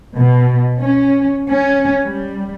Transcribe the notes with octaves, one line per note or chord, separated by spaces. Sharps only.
B2
C#4
C#4
G3